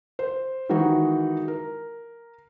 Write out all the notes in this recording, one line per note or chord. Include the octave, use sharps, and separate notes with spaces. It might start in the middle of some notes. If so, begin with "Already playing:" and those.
C5
D#3 E3 G#3 D#4 F#4
A#4